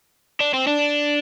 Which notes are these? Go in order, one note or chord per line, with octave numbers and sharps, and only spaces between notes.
D4
C4
D4